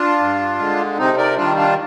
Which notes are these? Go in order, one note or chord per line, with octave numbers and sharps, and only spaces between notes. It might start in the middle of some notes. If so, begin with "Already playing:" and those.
Already playing: D4 F4
G2
D3 G#3
C3 C4 D#4
A#4 D5
D#3 G3 D4 F4
D4 F4